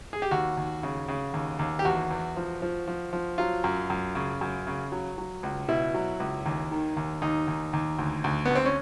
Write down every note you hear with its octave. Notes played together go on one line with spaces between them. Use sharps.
G#4
G4
D#2 F#4
D#2
C#3
C#3
D#2
D#2
G4
E2 F#4
E2
F3
F3
F3
F3
F#3 F4
F#2
F#2
C#3
F#2
C#3
F#3
F#3
C#2
B2 E4
F#3
C#2
D#2
D#3
D#2
D#2 D#4
D#2
D#2
D2
D2
D2 B3
C4
C#4